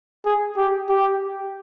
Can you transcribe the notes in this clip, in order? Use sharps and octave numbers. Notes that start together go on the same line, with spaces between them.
G#4
G4
G4